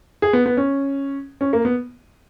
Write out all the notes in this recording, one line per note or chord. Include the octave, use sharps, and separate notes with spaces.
G#4
B3
B3
C#4
C#4
A#3
B3